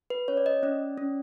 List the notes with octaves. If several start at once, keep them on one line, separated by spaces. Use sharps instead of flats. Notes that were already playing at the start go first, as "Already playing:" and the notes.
B4
C#4 C#5
D5
D#5
C#4 D5
C#4